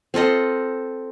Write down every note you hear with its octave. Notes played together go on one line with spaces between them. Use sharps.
C4 F4 A4 D#5